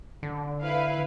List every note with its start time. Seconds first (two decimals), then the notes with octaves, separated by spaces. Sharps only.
0.23 D3
0.61 E4 B4 F5